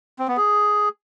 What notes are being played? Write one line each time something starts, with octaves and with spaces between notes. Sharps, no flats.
C4
B3
G#4